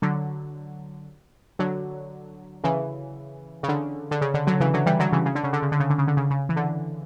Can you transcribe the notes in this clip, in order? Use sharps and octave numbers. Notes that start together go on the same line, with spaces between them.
D3 F#3
D3 F#3
C#3 E3
C#3
D3
D3
C#3
D3
D3 F#3
C#3 E3
D3 F#3
E3 G3
D3 F#3
C#3 E3
C#3
D3
C#3
D3
C#3
D3
C#3
D3
C#3
D3
C#3
C#3
E3
D3